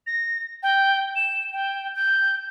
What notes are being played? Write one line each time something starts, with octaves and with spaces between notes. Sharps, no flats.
A#6
G5
E7
G5
G6